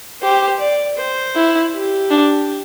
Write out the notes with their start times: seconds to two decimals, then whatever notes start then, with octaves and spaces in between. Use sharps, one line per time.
0.22 G4 C5
0.60 D5
0.97 C5
1.36 E4
1.73 G4
2.11 D4